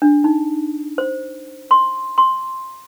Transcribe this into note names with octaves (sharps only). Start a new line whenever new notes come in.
D4
D#4
C5
C6
C6